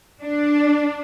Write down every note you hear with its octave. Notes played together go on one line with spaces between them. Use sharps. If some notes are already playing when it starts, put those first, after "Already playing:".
D4